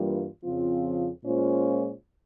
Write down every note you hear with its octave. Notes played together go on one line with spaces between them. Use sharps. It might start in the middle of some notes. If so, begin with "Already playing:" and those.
Already playing: G2 E3 G3 A#3 F4
F2 C#3 F3 C4 F4
A#2 G#3 C#4 F4 C5